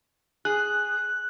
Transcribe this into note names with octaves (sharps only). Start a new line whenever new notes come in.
G#4 F#6